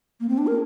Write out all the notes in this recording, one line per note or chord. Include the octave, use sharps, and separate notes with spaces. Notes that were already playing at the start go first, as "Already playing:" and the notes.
A#3
C4
D4
A#4